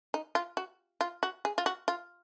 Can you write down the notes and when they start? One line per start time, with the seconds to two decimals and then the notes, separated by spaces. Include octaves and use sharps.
0.14 D#4
0.35 F4
0.57 F#4
1.01 F4
1.23 F#4
1.45 G#4
1.58 F4
1.66 F#4
1.88 F4